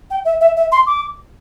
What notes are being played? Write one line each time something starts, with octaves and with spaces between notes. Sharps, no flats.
G5
E5
E5
E5
C6
D6